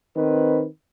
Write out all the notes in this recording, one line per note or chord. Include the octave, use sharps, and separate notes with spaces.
D#3 C4 B4